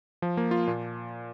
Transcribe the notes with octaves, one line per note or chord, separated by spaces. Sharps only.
F3
A#3
F4
A#2